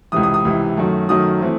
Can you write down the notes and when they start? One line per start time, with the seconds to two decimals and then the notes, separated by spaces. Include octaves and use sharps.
0.12 C#2 C3 E3 D#6
0.23 D#6
0.34 D#6
0.45 C#2 C3 E3
0.77 F#2 D#3 F#3 A3
1.09 F#2 D#3 F#3 A3 D#6
1.41 E3 A3 C4